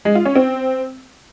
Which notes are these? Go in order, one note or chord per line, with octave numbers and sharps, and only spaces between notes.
G#3
F4
C#4
C4